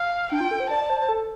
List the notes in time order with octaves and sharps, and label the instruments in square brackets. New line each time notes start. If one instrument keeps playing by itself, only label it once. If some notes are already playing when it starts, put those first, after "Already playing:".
Already playing: [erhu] F5
[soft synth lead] D4 [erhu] G5
[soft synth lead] F4
A4
C5
[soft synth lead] D5 [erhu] A5
[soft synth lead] D5
C5
C5
A4